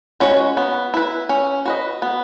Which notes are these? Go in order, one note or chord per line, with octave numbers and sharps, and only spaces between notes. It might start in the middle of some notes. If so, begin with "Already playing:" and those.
G#3 C#4 F#4 C#5
B3
E4 B4
C#4
F#4 B4 D#5
B3